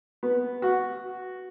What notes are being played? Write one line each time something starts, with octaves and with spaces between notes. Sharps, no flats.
B3
F#4